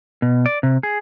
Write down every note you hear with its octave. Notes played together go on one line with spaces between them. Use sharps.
B2
D5
C3
G#4